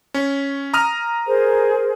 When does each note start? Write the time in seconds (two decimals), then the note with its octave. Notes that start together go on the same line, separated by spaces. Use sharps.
0.14 C#4
0.74 A#5 D#6 F6
1.27 G#4 A#4 C5